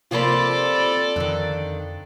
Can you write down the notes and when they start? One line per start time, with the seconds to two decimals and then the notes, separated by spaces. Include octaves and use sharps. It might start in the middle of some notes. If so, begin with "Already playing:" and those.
0.11 C3 F3 A#3 F4 A4 D5 B5
1.16 F2 D3 D#3